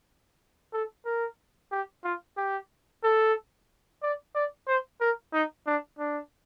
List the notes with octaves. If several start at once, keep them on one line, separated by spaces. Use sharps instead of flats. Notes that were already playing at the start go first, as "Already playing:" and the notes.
A4
A#4
G4
F4
G4
A4
D5
D5
C5
A#4
D#4
D4
D4